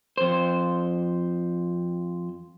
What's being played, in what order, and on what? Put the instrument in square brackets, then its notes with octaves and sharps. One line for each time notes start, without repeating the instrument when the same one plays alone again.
[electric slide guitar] F2 C5